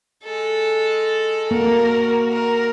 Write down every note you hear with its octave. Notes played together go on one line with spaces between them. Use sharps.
G#3 A4
A#3 F#4 A#4
A#4